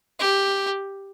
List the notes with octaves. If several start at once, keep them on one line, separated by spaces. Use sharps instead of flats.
G4